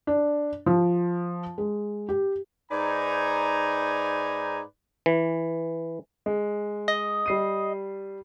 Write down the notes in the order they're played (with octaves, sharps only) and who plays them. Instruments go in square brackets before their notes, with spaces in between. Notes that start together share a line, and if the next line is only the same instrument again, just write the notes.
[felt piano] D4
F3
G#3
G4
[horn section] G#2 D#4 B4 D5 G#5 A#5
[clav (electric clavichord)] E3
[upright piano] G#3
[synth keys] D#5
[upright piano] G3 C7 D#7